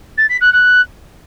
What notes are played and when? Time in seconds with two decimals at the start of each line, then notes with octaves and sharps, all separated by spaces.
0.17 A6
0.29 B6
0.41 F#6
0.53 F#6